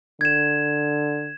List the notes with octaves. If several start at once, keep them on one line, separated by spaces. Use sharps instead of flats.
D3 G#6 E7